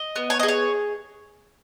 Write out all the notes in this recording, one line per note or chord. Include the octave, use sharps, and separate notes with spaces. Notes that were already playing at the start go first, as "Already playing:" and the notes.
Already playing: D#5
B3
C#5
D#5
G#4
C#5